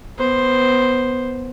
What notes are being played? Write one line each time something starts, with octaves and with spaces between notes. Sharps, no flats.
B3 C5